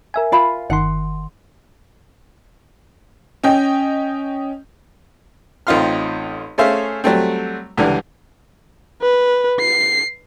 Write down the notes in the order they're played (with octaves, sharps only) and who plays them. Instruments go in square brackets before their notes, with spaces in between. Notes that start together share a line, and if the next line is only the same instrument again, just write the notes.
[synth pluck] A#4 E5 G#5
[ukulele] F4 F5 B5
[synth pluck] G1 D#3 C6 [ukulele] F#5
[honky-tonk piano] C#4 D#5 G5
[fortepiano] A1 C4 D#4 F4 C6 F6
A3 C#4 G#4 C5 E5 F5
F#3 G3 A3 C4
C#2 D3 E3 G3
[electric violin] B4
C7